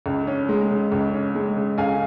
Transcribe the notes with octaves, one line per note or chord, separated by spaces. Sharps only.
C#2
C#4
G#3
C#3
C#2
C#4
G#3
C#3
C#2 F5 G#5